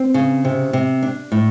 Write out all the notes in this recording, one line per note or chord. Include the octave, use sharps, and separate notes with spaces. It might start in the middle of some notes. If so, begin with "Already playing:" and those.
Already playing: C4
C#3
C3
C3
D4
A2